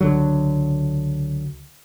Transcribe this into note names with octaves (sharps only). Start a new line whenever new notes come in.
C#2 D3 F#3